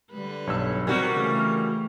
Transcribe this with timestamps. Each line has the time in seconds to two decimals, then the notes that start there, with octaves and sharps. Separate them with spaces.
0.12 D3 G3 B4
0.47 B1 G2 C#5 E6
0.87 C3 G3 C4 F#4 A#4 G#6
1.16 C#3 E3 A3